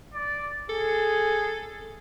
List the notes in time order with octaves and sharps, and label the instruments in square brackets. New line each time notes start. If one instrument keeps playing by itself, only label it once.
[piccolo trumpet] D5
[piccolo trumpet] G#4 [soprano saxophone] A4